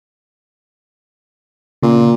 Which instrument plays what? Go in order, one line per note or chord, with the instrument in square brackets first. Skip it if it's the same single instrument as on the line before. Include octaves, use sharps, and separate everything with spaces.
[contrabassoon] A#2 [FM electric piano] C#3